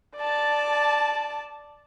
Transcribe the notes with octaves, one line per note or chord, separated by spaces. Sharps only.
D5 A5